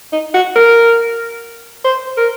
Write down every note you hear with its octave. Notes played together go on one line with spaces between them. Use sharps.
D#4
F#4
A#4
C5
A#4